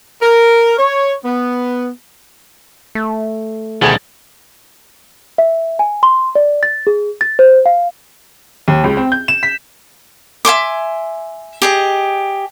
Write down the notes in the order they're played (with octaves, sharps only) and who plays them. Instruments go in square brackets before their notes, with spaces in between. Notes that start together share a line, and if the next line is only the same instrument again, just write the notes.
[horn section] A#4
C#5
B3
[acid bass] A3
[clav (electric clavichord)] D2 B2 D#3 [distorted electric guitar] G3 G#3 [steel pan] G#4 G#5
[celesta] E5
G#5
C6
D5
A6
G#4
A6
C5
F5
[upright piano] D#2
C#2
C4
G6
E7
B6
[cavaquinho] E5 G#5 C6 D6
G4 G#4 D#5